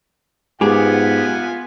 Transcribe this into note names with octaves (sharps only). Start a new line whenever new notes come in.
G#2 B3 F4 G4 G#4 F#5 G#5